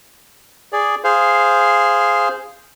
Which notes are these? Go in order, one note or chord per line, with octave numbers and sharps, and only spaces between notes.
G#4 D5
G#4 C5 F5